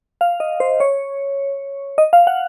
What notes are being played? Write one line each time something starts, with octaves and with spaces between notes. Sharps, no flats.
F5
D#5
C5
C#5
D#5
F5
F#5